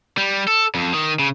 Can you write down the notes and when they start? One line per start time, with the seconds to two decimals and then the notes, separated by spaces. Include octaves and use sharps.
0.18 G3
0.48 A4
0.75 F2
0.94 D#3
1.19 C#3